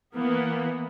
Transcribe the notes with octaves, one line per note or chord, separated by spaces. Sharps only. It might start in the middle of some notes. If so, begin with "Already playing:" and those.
E3 A#3 B3